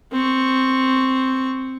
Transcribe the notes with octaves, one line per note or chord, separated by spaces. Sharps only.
C4 C#6